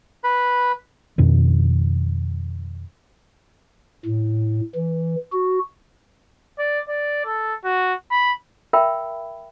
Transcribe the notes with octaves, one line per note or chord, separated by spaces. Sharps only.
B4 B5
F2 B2 D#3
A2
E3
F#4
D5
D5
A4
F#4
B5
A#4 E5 G5 B5